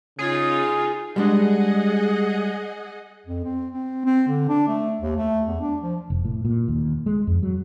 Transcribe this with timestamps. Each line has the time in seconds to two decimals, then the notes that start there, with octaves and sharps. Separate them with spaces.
0.19 C#3 D#4 F4 G#4
1.16 G3 G#3 D4 G#4 D#5 F#5
3.26 F2
3.44 C4
3.73 C4
4.05 C4
4.28 D3
4.49 D4
4.68 A3
5.01 D#2
5.17 A3
5.47 E2
5.61 D4
5.82 F3
6.10 F1
6.25 A2
6.45 A#2
6.68 D#2
7.06 G#3
7.27 F2
7.43 F#3